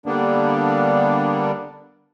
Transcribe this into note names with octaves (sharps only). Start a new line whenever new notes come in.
D3 G3 A#3 B3 D4